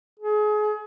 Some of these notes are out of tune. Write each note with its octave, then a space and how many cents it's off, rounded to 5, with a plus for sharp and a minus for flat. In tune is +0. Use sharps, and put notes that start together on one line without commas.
G#4 +30